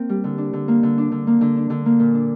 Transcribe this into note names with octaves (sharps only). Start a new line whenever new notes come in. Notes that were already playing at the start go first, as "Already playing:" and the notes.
Already playing: A#3 C4
G3
D3
D4
D3
A#3
D3
D4
D3
A#3
D3
D4
D3
A#3
A#2
D4